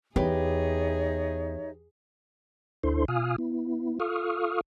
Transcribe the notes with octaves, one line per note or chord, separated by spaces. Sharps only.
E2 D#4 G4 G#4 B4 C#5 E5
D2 D4 E4 A4 C5 C6
B2 F4 F5 G#5 D#6 F6
B3 E4
F4 A4 F5 C#6 D#6 F6